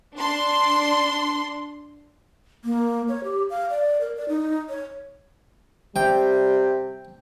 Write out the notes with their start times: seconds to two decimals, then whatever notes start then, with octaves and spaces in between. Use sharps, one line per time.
0.16 D4 C6
2.65 A#3
3.08 C#5
3.24 G4
3.50 F5
3.70 D5
4.01 A#4
4.17 D5
4.29 D#4
4.69 C#5
5.96 C3 G3 G5